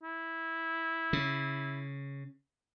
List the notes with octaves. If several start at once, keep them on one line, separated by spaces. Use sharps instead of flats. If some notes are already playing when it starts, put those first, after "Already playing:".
E4
C#3